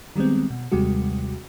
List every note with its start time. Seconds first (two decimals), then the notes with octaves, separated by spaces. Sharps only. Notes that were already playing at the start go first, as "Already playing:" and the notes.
0.16 D#3 G3 G#3 B3 C4
0.50 B2
0.72 D#2 C3 G3 G#3 F#4